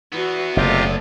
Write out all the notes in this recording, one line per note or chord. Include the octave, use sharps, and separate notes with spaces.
E2 E3 B3 F#4
F#1 C3 A3 F4 G4 D5